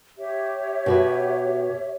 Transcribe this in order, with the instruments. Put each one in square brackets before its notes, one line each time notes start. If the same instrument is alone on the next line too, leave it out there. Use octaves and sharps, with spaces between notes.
[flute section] G4 C#5 E5
[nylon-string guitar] B2 F#4 B4